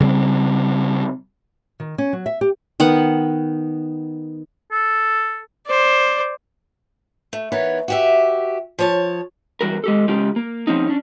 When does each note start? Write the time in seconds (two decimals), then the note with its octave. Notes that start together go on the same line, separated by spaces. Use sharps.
0.01 C#3 G3 A#3 C4
1.80 D#3
1.98 C#4
2.13 F#3
2.26 E5
2.41 G4
2.80 D#3 B3 F#5
4.72 A4
5.66 C5 D5
7.33 A3
7.52 E3 B3 D#4 A#4 C#5
7.88 F#4 G4 E5
8.79 F3 C#5 A5
9.61 E2 G3 F#4 A#4
9.84 G#3 G4 A4
10.08 C#3 G#3 C#4 F4 G4
10.36 A#3
10.67 F3 C4 C#4 D#4
10.87 C#4 D4